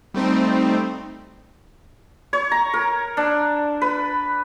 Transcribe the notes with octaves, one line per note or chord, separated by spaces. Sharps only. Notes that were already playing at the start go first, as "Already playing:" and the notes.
G3 A3 C4 D#4
C#5
A#5
A#4
D4
B4